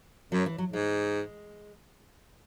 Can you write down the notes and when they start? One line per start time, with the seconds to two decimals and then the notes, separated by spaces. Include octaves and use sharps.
0.32 F#2 F#3
0.46 E3
0.58 F#3
0.73 G#2 G#3